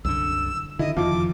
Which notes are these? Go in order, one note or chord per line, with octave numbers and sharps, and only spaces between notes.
C2 F#2 D3 E6
D3 D#3 E4 D#5
F#1 F2 D#3 F3 D6